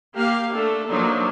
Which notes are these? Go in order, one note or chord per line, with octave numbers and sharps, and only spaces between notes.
A#3 G4 F5
A3 D4 A4
F3 F#3 A#3 D4 D#4